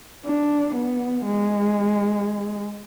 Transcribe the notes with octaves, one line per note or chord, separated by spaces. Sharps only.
D4
B3
G#3